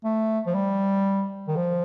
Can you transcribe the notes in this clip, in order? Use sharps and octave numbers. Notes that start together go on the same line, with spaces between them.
A3
F3
G3
D#3
F3